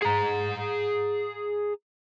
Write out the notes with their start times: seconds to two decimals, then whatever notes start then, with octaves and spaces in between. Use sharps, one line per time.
0.03 G#4 A#5